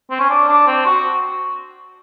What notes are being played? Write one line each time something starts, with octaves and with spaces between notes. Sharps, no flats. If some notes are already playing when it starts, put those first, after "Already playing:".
C4
C#4
D4
D4
C4
F#4